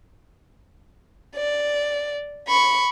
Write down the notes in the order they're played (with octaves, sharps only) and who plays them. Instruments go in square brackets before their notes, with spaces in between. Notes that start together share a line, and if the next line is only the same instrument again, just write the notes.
[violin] D5
B5 C#6